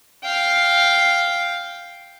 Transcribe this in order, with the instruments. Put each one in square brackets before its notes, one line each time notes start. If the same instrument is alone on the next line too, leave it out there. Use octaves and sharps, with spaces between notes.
[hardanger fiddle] F5 G5